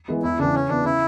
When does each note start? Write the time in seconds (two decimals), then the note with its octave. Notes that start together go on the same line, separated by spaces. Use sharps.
0.08 E3 G#3 B3
0.23 E2 E4
0.39 C#3 E3 D4
0.54 C#3 C#4
0.69 E3 B3 D4
0.85 C#3 E4